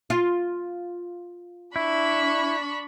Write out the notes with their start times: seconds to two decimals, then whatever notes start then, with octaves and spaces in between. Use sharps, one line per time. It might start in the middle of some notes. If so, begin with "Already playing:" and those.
0.10 F4
1.76 D4 E4 B5 C#6